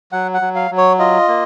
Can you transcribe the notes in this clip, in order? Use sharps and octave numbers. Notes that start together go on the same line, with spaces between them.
F#3 F#5
F#5
F#3
F5
F#3
C#5
F4 D#5
A#3